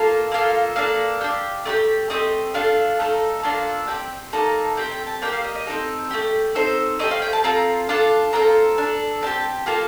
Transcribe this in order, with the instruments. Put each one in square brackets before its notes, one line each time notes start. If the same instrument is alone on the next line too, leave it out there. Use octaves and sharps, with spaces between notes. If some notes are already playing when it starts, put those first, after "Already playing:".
Already playing: [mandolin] A#3 F4 A4 F5
A#3 F4 A4
A#3 D4 A4 F5
D4 G4
A3 D#4 G4
A3 C4 G4 D#5
A3 D4 F4 A4 F5
A3 D#4 A4
A#3 D4 F4 A4
C4 G4 G5
A#3 D#4 A4 A5
A3 C4 G4 G5
G5
A5
A#3 D4 G4 G5
F5
D#5
D#5
C4 D#4 A4
A3 D#4 G4
C4 D#4 A4 C5
A3 C4 G4 D#5
F5
G5
A5
C4 F4 A4 A#5
D4 F4 A4 A5
C4 F4 A4 A#5
D4
A4
C4 D#4 G4 A5
A#3 F4 A4 A5